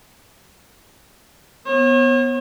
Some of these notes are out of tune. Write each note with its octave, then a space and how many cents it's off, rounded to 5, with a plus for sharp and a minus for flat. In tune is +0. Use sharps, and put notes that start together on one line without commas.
B3 +0 C#5 -40